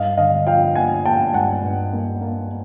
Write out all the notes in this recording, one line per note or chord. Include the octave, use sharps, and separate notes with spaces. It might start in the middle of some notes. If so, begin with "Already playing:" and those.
Already playing: G2 D#5 F5
D3 D#5 F5
F3 F5 G5
A#3 F#5 G#5
A#3 G5 A5
G2 F#5 G#5
G2
A#3
A#3